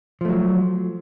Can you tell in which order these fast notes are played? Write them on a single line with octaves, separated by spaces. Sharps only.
F3 A3 F#3